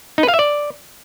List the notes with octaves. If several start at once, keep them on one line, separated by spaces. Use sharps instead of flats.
D#4
B4
F5
E5
D5